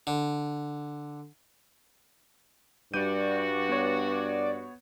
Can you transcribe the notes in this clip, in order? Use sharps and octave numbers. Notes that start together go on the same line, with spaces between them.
D3
G2 G3 F#4 D5 G6 D#7
B3 C#5